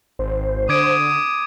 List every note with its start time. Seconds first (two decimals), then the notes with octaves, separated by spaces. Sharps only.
0.19 G#1 C5
0.69 D3 D6 D#6 G#6 D7